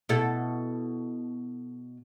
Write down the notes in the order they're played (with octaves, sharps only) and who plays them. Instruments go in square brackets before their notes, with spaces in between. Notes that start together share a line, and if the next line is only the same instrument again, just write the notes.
[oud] B2 E4 A4